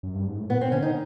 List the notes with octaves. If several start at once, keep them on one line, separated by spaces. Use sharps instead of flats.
F#2
G2
G#2
A2
A#2 B3
C4
D3 C#4
D#4